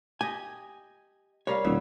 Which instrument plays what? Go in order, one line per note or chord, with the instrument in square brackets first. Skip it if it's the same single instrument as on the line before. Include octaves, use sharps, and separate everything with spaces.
[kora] G4 D#5 [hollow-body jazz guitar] G#5
[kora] G3 F5 [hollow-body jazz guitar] A#4 C#5
[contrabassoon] D#1 [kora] B2 E5